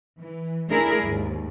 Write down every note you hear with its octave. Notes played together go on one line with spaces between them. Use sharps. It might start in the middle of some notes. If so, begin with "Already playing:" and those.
E3
A3 D4 E4 G#4 A#4
D#2 G#2